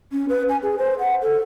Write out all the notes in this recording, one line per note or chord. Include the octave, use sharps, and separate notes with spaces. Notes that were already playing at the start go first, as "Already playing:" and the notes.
C#4
B4
G#5
G#4
C5
F#5
A4